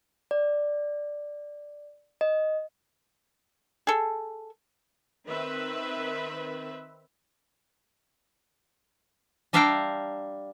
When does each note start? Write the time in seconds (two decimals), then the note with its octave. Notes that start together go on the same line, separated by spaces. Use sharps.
0.31 D5
2.21 D#5
3.87 G#4 A4
5.26 D#3 C4 B4 E5
9.53 G3 D4 E5 F5 G5 A#5